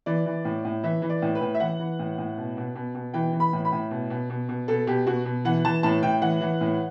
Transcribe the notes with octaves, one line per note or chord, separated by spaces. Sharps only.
E3 D5
E3
A2
A2
E3 E5
E3
D5
A2
B4
A2
E5
E3 F#5
E3
A2
A2
B2
B2
B2
B2
E3 G5
E3
B5
A2
B5
A2
B2
B2
B2
B2
B2 A4
B2 G4
B2 F#4
B2
E3 F#5
E3 A5
A2 A5
A2 G5
E3 F#5
E3
A2